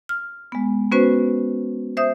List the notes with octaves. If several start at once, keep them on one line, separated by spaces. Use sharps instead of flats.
F6
G#3 B3
B3 C#4 F#4 B4 C5
C5 E5 D#6 G6